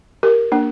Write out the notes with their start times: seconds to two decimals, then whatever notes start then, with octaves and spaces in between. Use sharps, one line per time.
0.23 G4 A#4
0.52 A#3 D4